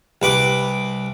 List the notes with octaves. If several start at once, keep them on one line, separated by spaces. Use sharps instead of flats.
C2 B4 D6